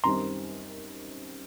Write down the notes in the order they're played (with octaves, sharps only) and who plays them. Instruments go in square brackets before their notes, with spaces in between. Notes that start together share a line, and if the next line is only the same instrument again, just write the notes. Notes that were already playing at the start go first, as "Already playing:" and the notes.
[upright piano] F#2 D#3 G3 C4 D#4 [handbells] A#5 C6